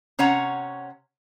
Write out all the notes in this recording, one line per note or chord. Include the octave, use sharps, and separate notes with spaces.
C3 C#4 C#5 F#5 A#5